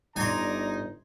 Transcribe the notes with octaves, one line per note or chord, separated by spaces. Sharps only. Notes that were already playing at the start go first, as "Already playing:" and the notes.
G1 D#4 D5 G#5 A#5 C6